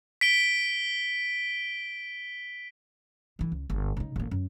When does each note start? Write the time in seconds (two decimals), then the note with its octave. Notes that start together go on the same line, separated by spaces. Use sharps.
0.21 B6 D7 G7
3.39 D3 E3
3.52 C#2
3.70 G1
3.97 C#3 D#4
4.16 A1 A#3
4.31 F#2